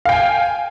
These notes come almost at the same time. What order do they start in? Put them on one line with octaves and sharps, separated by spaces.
F5 G5 G#5